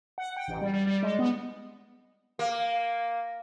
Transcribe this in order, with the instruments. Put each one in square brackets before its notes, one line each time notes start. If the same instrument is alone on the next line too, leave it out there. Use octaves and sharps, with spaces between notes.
[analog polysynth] F#5
G5
A1
G3
G3
G3
G#3
B3
[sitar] A#3